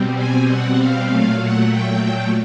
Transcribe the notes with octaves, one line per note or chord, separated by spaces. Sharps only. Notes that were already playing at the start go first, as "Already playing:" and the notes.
Already playing: B2 G3 C4
G#5
F#5
F5
A#2 F#3 A3 F5
F#5
G5